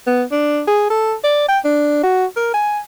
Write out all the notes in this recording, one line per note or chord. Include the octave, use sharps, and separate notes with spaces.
B3
D4
G#4
A4
D5
G5
D4
F#4
A#4
G#5